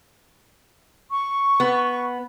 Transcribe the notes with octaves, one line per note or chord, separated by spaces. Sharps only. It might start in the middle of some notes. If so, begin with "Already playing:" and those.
C#6
B3